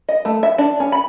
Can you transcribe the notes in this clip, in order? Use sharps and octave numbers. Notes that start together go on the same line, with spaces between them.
D#5
A3
E5
D4
C#4
B5